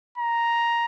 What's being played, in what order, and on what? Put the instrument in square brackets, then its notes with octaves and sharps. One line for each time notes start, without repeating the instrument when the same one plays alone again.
[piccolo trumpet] A#5